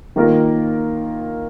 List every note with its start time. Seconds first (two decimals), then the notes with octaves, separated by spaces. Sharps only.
0.16 D#3 A#3 F4 A#4